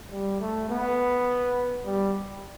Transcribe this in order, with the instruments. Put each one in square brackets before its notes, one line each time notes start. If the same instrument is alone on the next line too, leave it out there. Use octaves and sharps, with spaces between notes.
[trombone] G3
A3
B3
G3